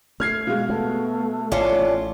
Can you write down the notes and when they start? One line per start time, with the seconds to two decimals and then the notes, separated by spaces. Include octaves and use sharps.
0.20 A3 F6 G#6 C7
0.47 B2 G#3 F5
0.69 A3 B3
1.52 A1 C#4 D4 F4